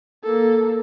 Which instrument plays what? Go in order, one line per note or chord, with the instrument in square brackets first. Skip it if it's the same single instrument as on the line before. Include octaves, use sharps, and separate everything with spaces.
[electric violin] A#3 A4